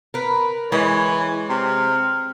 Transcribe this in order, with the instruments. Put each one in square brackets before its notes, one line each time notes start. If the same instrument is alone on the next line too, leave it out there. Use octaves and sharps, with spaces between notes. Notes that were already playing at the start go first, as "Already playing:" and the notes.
[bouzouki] A#4 B4
[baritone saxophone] E3 [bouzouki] G#3 [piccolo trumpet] C#5
[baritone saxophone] C3 [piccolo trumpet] F6